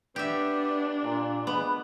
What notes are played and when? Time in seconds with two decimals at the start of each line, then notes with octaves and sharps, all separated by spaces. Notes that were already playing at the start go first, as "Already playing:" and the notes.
0.16 B3 D4 G4 E5
1.04 A#2
1.47 G#3 B3 B4